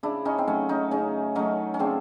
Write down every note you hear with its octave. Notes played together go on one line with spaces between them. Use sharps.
C#3 D4 E4
C#4 D#4
C4
F#3 A3 C#4
C#4 D#4
C#3 C#4 D#4
F#3 A3 C#4 D#4
C#4
C#3 C4 D4